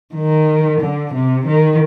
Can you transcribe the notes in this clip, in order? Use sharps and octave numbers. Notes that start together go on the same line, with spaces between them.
D#3
D3
C3
D#3